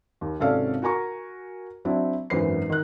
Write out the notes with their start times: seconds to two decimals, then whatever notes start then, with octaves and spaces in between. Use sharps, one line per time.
0.21 D#2
0.39 G#1 C3 C#4 A4 D5 F5
0.82 F#4 A#4 G#5 A#5 C#6
1.85 F#3 C4 D4 E4
2.30 G#1 F#2 E3 B4 C5 C7
2.70 D#3 F#6